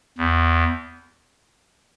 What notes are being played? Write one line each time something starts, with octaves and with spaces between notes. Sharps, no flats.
E2